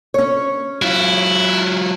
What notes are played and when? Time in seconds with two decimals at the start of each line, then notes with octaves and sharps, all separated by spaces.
0.14 C#4 C#5
0.82 F#3 E4 F4